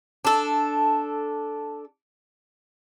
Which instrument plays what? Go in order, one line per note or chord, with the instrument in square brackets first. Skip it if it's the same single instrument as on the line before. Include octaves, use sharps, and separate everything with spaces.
[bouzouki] D4 A4